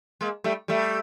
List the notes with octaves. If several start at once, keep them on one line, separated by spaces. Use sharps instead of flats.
G#3 A#3
G3 A3
G3 A3